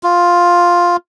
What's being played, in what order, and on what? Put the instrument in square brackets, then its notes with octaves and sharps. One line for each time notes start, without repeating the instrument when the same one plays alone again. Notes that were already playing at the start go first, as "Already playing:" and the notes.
[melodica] F4